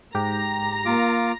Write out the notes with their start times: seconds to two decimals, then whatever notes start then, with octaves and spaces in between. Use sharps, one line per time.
0.15 G#2 G4 A#5
0.85 A#3 F4 D6